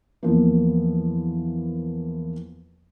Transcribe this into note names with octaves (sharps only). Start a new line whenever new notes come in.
E2 F3 A#3